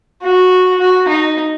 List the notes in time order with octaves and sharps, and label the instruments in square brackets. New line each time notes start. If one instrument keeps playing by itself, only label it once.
[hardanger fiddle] F#4
F#4
D#4